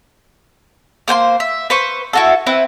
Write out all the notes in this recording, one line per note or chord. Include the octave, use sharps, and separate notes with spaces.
A#3 C5 G5 C6
E5
B4 C5 C#6
E4 F#4 A4
C4 E4 B4